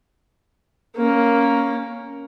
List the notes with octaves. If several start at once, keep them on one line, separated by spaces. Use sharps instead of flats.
A#3 C#4